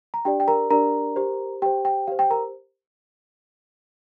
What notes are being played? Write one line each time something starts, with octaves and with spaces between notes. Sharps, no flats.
A#5
D4 G4 D5 G5
G5
A#4 A#5
D4 G4 A#4 D5 A#5
G4 C5
G4 C5 G5
G5
G4 C5 F5
G5
A#4 A#5